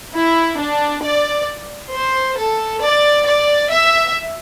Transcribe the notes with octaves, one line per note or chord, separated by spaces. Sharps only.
E4
D4
D5
C5
A4
D5
D5
E5